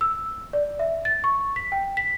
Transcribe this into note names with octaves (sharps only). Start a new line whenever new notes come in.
E6
D5
E5
A6
C#6
B6
G5
B6